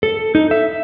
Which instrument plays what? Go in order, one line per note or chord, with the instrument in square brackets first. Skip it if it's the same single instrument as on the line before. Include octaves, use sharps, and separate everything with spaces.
[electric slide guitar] A4
D#4
E5